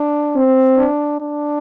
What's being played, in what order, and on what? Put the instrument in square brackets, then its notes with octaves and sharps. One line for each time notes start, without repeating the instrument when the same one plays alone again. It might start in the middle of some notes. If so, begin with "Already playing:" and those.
Already playing: [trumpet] D4
[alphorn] C4
[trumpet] D4
D4